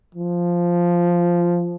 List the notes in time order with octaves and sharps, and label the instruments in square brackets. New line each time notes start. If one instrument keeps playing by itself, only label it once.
[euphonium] F3